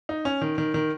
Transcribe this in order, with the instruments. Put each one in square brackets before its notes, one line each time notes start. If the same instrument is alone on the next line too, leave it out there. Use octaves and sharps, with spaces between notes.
[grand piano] D#4
C#4
D#3
D#3
D#3